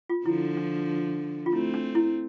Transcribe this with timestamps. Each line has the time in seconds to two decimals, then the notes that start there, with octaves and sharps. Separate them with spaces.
0.09 F4
0.25 D3 F3 E4
0.57 D4
1.46 F4
1.52 A3 C4 E4
1.74 D4
1.95 E4